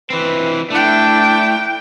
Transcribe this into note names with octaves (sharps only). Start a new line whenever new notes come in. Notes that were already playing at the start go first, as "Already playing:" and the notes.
E3 C4 B4
A3 D4 E4 G5